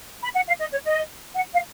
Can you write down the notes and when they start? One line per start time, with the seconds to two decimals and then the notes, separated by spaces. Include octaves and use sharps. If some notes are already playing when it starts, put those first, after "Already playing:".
0.23 B5
0.35 F#5
0.47 F5
0.60 D#5
0.72 C#5
0.84 D#5
1.35 F#5
1.53 F5